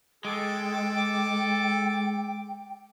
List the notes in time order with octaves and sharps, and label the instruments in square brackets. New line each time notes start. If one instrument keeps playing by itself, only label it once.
[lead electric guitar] G#3 [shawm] A4 [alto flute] G5 [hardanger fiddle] D6